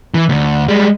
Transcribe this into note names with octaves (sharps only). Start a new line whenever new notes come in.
E3
D2 D3
G3 G#3